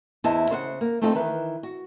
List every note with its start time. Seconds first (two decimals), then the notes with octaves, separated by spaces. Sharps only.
0.24 E2 E4 C5 D#5 A5
0.50 C#3 C5 F5 F#5
0.81 A#3
1.01 A3 C4 D#4 F4 G#4 A4
1.15 D#3 E3 B4
1.63 F#4